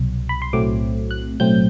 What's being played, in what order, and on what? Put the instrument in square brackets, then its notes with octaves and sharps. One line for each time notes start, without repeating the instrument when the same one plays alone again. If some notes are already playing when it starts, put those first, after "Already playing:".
Already playing: [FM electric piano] C2 B2 F#3
B5
C6
B1 A2 F#3 A3 C4 D6
F#6
B1 A2 F#3 A3 C4 G6